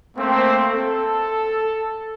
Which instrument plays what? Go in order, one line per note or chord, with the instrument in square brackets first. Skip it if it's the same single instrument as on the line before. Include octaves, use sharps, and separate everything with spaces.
[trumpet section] A3 A#3 C4
A4